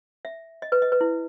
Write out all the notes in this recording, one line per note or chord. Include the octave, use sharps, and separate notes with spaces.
E5
D#5
B4
D#5
B4
E4